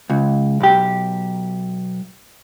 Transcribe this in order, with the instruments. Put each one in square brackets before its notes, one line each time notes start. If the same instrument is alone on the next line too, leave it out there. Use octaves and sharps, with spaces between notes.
[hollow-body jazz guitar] C#2
B1 G4